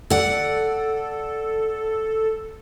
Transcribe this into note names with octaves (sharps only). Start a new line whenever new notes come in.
A4 D5 F#5